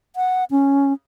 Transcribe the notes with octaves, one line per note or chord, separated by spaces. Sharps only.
F#5
C#4